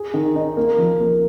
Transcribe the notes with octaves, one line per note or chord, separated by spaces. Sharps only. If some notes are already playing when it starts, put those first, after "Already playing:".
Already playing: G#4
D#3
D#4
A#3
F3
A#3